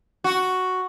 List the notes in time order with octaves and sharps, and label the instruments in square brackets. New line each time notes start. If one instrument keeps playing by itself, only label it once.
[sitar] F#4